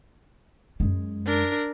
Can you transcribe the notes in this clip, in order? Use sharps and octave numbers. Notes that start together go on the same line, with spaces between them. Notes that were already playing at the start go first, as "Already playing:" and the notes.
F#2 G#3
D4 A#4